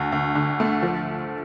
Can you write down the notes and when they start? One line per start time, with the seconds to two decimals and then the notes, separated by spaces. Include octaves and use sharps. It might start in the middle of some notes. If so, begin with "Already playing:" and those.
Already playing: D2
0.12 D2
0.35 D3
0.60 A3
0.83 F3